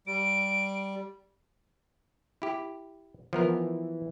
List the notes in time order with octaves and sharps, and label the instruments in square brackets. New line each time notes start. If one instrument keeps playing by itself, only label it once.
[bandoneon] G3 [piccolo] D7
[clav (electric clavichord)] E4 G4
[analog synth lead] E3 [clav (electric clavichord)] F3 B3 A#4